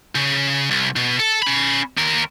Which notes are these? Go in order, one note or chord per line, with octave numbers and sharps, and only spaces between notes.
C#3
C2
B2
A4
C#4 B5
D#2 A#4